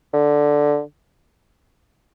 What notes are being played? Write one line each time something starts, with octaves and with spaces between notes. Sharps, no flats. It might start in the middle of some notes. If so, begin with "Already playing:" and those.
D3